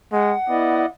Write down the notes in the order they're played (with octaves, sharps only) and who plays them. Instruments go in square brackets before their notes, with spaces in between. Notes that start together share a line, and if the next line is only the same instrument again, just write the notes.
[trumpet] G#3 [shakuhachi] F#5
[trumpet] B3 [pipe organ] E4 D5 D#5